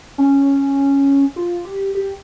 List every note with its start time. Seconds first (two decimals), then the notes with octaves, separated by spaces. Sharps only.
0.18 C#4
1.36 F4
1.65 G4
1.95 G4